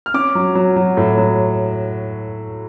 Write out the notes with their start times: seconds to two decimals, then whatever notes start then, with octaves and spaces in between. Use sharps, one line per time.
0.06 F6
0.14 C#4 D6
0.35 F#3
0.55 F#3
0.76 F#3
0.97 A2
1.18 F#3